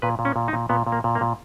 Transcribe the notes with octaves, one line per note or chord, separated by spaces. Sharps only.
A#2 B4
A#2
C#4
A#2
D#4
A#2
A#2 B3
A#2
A#3
A#2
A#3
A#2